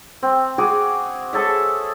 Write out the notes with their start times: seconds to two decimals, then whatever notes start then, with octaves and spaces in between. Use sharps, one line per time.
0.23 C4
0.58 F#4 G#4 G#5 D6
1.33 G#4 A4 C#5 E5